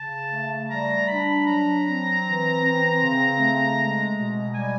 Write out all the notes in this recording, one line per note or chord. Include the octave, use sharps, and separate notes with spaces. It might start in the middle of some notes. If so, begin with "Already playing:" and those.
Already playing: C#3 A5
A3
G3 A#5
D4 B5
F#3 A#5
C4
E3
C4
C#3
A3
G#3
B2
G3 G#5